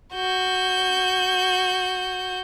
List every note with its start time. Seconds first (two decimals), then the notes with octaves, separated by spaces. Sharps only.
0.14 F#4 G6